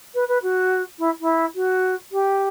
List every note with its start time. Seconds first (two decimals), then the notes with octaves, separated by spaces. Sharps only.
0.14 B4
0.28 B4
0.42 F#4
0.98 E4
1.20 E4
1.55 F#4
2.12 G4